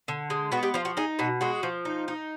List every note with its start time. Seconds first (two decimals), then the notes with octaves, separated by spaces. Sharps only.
0.08 D3
0.30 G#3
0.52 B3 F#4
0.63 G4
0.74 F3 F4
0.85 F#4
0.97 D#4 G#4
1.19 B2 F#4
1.41 G#3 F#4
1.63 F3
1.85 D#4
2.08 D#4